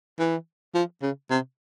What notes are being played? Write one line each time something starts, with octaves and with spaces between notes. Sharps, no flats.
E3
F3
C#3
C3